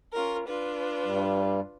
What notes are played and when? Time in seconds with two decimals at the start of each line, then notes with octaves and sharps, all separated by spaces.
0.13 C#4 F4 A#4
0.47 D4 F4 B4
1.04 G2 G3